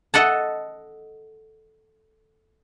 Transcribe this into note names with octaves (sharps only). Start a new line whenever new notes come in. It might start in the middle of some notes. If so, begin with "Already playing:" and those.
A4 D#5 F#5 A5